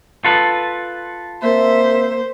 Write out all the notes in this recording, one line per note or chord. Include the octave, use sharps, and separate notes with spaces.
F4 A4 B4
A#3 C4 C5 E5